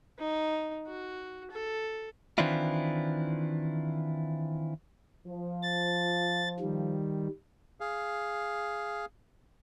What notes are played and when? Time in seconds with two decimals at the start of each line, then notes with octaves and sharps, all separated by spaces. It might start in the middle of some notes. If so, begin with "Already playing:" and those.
0.19 D#4
0.87 F#4
1.51 A4
2.38 D#3 E3 C4 D4 E4 F4
5.27 F3
5.63 A6
6.60 D#3 G3
7.80 G#4 F5